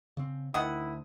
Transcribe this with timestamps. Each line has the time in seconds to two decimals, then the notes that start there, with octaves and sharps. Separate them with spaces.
0.17 C#3 C4
0.54 D2 D#3 E4 F#5 D#6